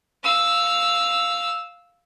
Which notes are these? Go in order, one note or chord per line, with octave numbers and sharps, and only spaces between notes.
F5 E6